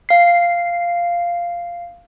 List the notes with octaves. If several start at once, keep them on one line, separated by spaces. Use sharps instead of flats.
F5 C7